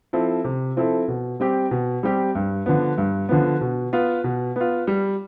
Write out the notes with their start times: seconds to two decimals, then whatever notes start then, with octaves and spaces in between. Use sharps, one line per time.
0.13 F3 C4 E4 A4
0.44 C3
0.76 F3 C4 E4 A4
1.08 B2
1.40 G3 C4 G4
1.71 B2
2.03 G3 C4 G4
2.35 G2
2.66 D3 F3 B3
2.98 G2
3.29 D3 F3 B3
3.61 B2
3.93 B3 F4
4.24 B2
4.56 B3 F4
4.87 G3